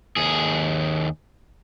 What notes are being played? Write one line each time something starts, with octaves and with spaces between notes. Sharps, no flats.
D#2 G#4